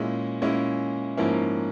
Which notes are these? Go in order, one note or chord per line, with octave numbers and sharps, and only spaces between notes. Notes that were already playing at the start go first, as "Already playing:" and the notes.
Already playing: A#2 G#3 C#4 E4
A#2 G#3 C#4 E4
G#2 F3 A#3 C#4 E4